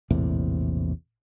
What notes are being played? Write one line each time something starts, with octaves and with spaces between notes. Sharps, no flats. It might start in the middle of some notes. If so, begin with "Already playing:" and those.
A#1 E2 A2 C3